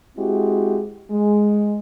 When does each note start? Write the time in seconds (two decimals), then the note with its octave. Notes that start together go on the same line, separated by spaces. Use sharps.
0.17 G#3 C4 E4 F#4 G4
1.11 G#3